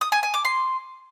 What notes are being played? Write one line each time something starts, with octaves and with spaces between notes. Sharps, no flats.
D#6
G#5
G#5
D6
C6